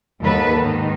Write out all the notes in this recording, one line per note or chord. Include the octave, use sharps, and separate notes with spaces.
D#2 G#2 G#3 B3 A4 B4
G#2 D#3